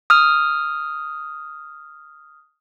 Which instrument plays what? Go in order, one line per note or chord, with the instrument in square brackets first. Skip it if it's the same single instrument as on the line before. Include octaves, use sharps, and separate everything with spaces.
[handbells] D#6 F6